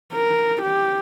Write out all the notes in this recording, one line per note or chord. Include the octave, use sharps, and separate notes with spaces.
A#4
G4